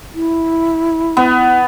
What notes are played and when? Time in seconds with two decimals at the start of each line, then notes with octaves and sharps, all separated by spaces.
0.14 E4
1.17 B3